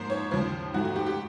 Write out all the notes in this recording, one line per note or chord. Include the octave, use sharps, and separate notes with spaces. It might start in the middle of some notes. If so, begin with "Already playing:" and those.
Already playing: G#2 F3 A#3 C5
C#5
D#2 C#3 F3 C5
G#2 F3 A3 F#4
F#4
G4
G4